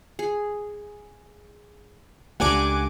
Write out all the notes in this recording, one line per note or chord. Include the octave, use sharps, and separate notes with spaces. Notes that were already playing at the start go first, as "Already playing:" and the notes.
G#4
C#2 G3 A3 D4 A#4 F#5 G#5 D6